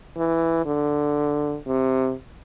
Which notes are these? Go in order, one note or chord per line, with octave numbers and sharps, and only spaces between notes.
E3
D3
C3